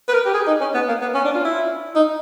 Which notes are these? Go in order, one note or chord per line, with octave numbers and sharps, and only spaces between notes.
B4
A#4
G4
G#4
D#4
C#4
B3
A#3
B3
C#4
D4
F4
E4
D#4